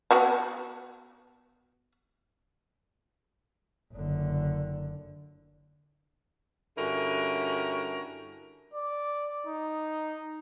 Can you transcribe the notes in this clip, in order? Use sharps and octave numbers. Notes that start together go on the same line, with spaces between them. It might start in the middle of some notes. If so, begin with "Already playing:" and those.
B3 F#4 A5
F#1 D3
G2 D3 C#4 E4 F#4 A#4
D5
D#4